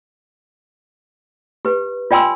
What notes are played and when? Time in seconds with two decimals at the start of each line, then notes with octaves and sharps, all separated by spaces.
1.65 G4 B4
2.11 F4 D5 G5 G#5 C6 E6